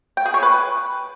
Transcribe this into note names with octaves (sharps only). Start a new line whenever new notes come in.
G5
G#4
C#5
B4